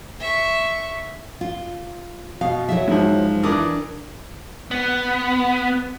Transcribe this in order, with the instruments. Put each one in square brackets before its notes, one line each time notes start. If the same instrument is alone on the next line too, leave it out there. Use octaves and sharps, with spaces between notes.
[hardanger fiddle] E5 C#6
[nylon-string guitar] F4
[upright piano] B2 [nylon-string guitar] F5
[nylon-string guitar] F#3 E4 E5
[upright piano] G#2 F3
[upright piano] E3 D6 D#6 [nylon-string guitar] D4 A#4
[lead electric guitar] B3